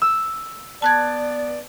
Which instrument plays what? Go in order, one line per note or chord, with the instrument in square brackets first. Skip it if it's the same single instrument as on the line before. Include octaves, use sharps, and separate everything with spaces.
[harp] E6
[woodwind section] B3 D5 [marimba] A5 F#6 G#6